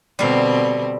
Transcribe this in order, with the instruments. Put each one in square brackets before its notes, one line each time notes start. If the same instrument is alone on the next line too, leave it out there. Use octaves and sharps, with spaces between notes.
[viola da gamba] B2 D3 C4 [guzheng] G3 F5